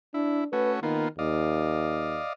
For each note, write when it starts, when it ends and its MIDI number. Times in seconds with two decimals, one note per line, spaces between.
0.14 0.45 62
0.14 0.44 64
0.53 0.80 57
0.53 0.80 61
0.53 0.80 66
0.53 0.72 71
0.83 1.07 51
0.83 1.08 58
0.83 1.08 59
0.83 1.08 65
1.19 2.19 39
1.19 2.33 74
1.19 2.33 75
1.19 2.33 77